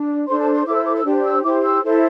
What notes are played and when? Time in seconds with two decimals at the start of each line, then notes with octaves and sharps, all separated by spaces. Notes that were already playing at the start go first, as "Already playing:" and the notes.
Already playing: D4
0.27 D4 A4 C5 C6
0.39 A5
0.53 C6
0.66 E4 A4 C5 D6
0.75 E6
0.85 D6
0.95 E6
1.05 D4 G4 C5
1.24 E6
1.43 E4 G4 C5 D6
1.63 E6
1.83 E4 A4 C5